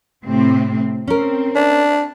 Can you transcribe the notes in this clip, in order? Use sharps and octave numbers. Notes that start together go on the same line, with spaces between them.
A2 C3 C4
C4 C#4 A#4
D4